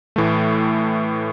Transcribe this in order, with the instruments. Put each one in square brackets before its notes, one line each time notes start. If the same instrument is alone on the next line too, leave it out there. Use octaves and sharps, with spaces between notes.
[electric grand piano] A2 E3 A3